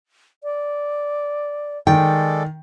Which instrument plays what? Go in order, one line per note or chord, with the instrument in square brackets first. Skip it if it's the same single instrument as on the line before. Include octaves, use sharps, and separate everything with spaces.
[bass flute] D5
[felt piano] D#3 [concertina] G#3 A4 D5 [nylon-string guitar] G5